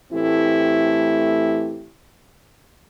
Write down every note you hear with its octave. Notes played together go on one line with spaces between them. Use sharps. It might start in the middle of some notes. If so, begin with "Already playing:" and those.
A2 E3 A3 C4 E4 G4